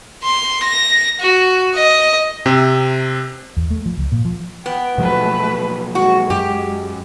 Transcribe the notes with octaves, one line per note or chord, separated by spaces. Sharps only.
C6
A#6
F#4
D#5
C3 C4
E2
A3
F3
C#2
A#2
F3
B3 G5
B2 F3 F#3 A3 B4
G#3 F#4
F#2 G4